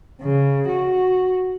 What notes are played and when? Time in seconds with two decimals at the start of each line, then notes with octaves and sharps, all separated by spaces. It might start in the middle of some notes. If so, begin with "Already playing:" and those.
0.21 C#3
0.68 F#4